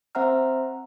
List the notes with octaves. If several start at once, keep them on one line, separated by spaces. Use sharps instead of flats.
C4 C5 E5 F#5 A#5 F6